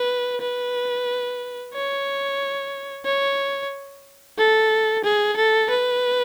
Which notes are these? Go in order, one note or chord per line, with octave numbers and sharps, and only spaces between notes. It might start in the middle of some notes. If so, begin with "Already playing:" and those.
Already playing: B4
B4
C#5
C#5
A4
G#4
A4
B4